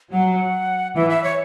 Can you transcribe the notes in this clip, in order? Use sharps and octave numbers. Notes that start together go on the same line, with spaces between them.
F#3 F#5
E3 E5
E5
C#5